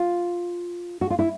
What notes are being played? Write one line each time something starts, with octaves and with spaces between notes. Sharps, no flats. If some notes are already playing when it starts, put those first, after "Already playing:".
Already playing: F4
F#4
F4
E4